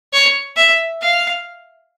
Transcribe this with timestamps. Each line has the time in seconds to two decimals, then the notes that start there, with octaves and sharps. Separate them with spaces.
0.13 C#5
0.57 E5
1.01 F5